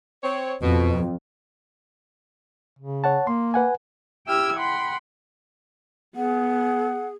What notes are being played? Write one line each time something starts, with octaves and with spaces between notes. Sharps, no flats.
C4 C#5
F2 B2
C#3
C#5 F#5 A5
A#3 C6
B4 F#5 G#5
E4 G4 G5 E6 F6 G#6
F#5 G5 B5 C6
B3 G#4 F#5